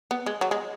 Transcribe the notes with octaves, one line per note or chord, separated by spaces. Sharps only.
B3
G#3
F#3
G#3